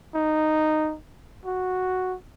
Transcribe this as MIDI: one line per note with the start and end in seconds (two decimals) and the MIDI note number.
0.15 0.95 63
1.45 2.16 66